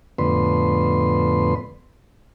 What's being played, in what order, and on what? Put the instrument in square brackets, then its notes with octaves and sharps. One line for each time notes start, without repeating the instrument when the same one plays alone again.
[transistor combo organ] F2 A2 D3 B3 B4 C6